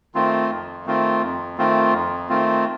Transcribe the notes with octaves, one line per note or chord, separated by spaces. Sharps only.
D#3 A3 C4 F4
F2
D#3 A3 C4 F4
F2
D#3 A3 C4 F4
F2
D#3 A3 C4 F4